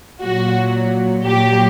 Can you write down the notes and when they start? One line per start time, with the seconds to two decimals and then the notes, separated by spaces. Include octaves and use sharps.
0.22 A#2 F#3 F#4
1.25 A#2 F#3 G4